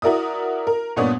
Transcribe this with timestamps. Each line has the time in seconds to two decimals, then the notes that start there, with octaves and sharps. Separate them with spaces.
0.02 E4 F#4 A#4 D5 E5 D#6
0.67 A#4
0.96 G2 A#2 B3 C#5 D5 D#6